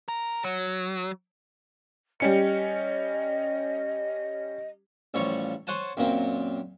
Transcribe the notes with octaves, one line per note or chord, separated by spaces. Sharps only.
A#4
F#3
G3 C#4 D#5 C#7
A1 F3 G3 C#5 C#6
C5 C#5 F#5 G#5 A5
F#2 A#2 A#3 C4